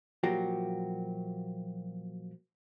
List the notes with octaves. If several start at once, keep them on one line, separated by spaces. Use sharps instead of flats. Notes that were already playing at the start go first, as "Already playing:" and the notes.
A#2 F3 F#3 A#3 F#4 G4